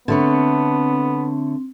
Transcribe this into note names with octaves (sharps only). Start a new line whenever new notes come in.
D3 A3 B3 C4 C#5